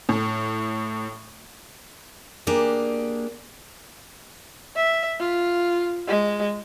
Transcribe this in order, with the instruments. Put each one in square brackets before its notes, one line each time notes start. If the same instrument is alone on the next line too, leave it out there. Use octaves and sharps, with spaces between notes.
[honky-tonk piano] A2
[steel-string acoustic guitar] A#3 D4 G4 G#4
[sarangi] E5
F4
G#3